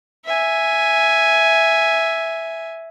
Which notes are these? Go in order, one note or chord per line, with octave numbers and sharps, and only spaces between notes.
E5 G#5